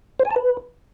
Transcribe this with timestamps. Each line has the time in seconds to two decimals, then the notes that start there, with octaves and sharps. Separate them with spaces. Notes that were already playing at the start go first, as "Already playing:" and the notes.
0.20 C5
0.25 G#5
0.31 A5
0.36 B4